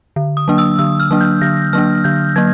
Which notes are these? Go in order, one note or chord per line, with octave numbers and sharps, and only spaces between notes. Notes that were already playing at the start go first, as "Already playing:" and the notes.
D3
D#6
F#3 A#3 D4
E6
D3 E6
F6
F#3 A#3 D4
G6
D3 A#6
F#3 A#3 D4 F6
D3 G6
F#3 A#3 G#6